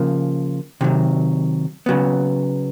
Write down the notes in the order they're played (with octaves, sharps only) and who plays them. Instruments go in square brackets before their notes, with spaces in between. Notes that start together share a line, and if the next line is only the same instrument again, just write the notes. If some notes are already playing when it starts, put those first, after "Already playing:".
Already playing: [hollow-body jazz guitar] C#3 F3 A#3
C3 D#3 F#3
C#3 F#3 B3